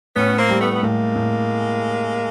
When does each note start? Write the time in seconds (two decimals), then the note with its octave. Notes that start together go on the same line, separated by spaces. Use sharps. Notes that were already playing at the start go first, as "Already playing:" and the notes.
0.15 A2 B3 C#4
0.38 A#3 C4
0.49 G3
0.60 A3 B3
0.72 B3
0.82 A2 G#3 A#3
1.16 A2